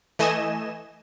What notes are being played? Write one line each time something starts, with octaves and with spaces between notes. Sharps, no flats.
E3 A3 D#5 G#5 E7